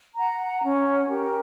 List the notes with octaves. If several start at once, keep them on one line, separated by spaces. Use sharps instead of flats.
F#5 A#5
C#4
G4 A#4